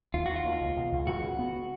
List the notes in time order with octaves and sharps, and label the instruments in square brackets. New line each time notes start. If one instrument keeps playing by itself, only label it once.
[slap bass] D#2 [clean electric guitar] F4
[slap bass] D#3 [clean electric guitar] F#4
[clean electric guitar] F4
[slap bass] D#2
C#2
B2
C#2
[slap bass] C#2 [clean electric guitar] F#4
[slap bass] C#3
B3